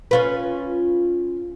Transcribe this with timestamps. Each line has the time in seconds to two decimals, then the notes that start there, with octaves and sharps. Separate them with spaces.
0.11 C#4 F4 B4